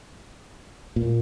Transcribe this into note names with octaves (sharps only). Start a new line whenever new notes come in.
A#2